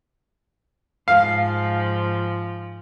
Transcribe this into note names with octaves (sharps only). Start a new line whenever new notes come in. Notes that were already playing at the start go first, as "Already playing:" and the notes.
G#2 F3 F5